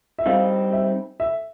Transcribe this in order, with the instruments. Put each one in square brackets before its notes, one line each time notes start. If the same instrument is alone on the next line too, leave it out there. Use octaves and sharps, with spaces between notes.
[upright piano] E5
[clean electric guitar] G3 C4 D#4 [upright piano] F5
[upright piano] E5
E5